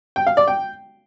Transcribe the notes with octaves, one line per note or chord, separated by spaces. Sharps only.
G5
F5
D5
G5